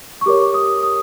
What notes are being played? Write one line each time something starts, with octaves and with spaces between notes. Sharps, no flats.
C#6
G4 A#4 C#5 D6
D#6
D#6